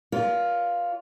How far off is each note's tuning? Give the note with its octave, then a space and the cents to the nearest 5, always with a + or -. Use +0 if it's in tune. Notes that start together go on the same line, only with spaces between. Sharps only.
F4 +0 A#4 +40 C#5 +45